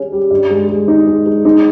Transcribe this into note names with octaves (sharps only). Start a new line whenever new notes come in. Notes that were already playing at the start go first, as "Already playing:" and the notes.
Already playing: G3 C#4 G#4
G3
G2
G#3
G#3
D#4
G#3
G#3
D#4